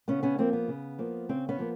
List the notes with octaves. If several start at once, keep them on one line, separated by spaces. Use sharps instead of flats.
C#3 B3 C#4
B3 C#4
F3 A#3 C4
B3
C#3
F3 A#3
C#3 C4
B3 C#4
F3 A#3